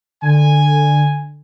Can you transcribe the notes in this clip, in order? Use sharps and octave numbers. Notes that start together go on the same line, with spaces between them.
D3 G#5